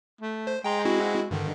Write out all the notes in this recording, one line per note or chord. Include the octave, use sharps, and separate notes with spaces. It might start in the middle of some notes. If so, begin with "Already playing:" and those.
A3
C5
G#3 G5 A#5 C6
C4 E4 F#4
G2 D3 D#3